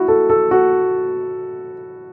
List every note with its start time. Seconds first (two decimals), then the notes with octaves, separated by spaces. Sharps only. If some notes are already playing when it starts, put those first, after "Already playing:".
Already playing: E4 F#4
0.08 A4
0.30 A4
0.51 F#4